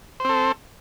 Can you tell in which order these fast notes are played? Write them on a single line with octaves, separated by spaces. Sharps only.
C5 C4 A4